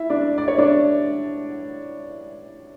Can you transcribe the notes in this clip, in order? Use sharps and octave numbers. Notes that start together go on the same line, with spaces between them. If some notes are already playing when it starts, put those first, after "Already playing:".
Already playing: E4 E5
D4 D5
D5
C#5
D4 D5